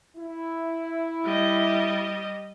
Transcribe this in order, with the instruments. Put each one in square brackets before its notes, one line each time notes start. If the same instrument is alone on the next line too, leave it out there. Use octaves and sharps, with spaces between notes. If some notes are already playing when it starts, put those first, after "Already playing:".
[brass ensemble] E4
[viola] G3 D#5